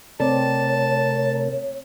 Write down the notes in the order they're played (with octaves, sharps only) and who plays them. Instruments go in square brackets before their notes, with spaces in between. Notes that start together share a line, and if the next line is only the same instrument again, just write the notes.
[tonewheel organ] C3 A3 A#4 [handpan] C4 D5 [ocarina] C#5 [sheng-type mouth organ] A5